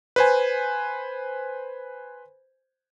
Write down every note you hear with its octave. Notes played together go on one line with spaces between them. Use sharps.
B4 C5 G#5